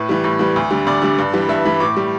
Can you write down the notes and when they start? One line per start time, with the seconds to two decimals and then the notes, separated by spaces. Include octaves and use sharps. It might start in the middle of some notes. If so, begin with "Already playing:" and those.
Already playing: A2 B4
0.09 E3 G3
0.24 A2
0.39 E3 G3
0.56 D2
0.71 D3 G3
0.86 D2 D5
1.02 D3 G3
1.18 G2
1.34 E3 G3
1.49 G2 E5
1.65 E3 G3 B5
1.80 A2 D6
1.97 G3